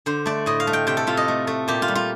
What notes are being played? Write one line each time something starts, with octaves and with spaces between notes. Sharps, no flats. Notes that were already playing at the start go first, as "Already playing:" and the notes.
D3 C5
A3 D5
A2 D#5
F5
A3
G5
C3 G5
A4
C3 F4
D#5
A3
A3
A#2 G4
F4
G3
F4